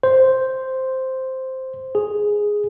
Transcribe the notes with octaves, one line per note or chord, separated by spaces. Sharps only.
C5
G#4